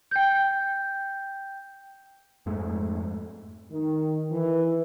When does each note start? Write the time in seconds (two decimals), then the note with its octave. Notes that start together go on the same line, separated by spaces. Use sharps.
0.11 G5 G6
2.46 F2 G#2 G#3 A3
3.71 D#3
4.30 E3